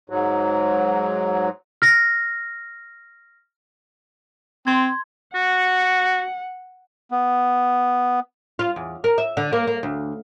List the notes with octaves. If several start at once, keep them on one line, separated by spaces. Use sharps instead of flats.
G#2 F#3
F6 A#6
C4 C6 G#6
F#4 F#5
B3
F4
E2
A#4
E5
D3
A#3
A#3
D2